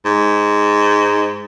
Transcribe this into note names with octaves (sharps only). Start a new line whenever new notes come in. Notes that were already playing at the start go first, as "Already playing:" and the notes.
G#2